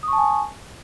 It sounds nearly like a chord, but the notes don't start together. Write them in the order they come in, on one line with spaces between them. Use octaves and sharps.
D#6 C#6 A5 G#5